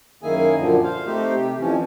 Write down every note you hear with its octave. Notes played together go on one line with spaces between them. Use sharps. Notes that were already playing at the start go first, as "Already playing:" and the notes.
F#2 D#3 A#3 E4 G#4 G#5
F#2 A#2 D3 F3
C5 F5
A3 C4 D#4 G4 C5
C3 G4
F2 E3 F3 C#4